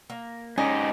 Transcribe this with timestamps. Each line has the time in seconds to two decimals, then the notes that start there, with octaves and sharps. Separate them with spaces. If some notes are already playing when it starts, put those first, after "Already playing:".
0.10 A#3
0.58 G#2 C#4 D#4 G4 D#5 G#5